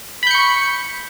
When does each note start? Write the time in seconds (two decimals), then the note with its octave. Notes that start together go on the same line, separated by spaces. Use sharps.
0.23 B5
0.27 G6
0.31 C#7
0.35 C#6